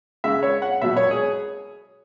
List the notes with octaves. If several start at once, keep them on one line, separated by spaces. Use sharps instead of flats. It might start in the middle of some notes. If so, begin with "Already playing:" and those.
C#3 G#3 E5
C#5
F#5
B2 F#3 E5
C#5
G#4